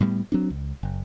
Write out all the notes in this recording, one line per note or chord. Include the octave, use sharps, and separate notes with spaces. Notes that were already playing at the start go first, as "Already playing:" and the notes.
A2 G3 A#3 B3
F#3 C4 D4
C#2
F#1